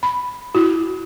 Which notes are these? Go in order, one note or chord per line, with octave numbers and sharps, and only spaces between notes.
B5
E4 F#4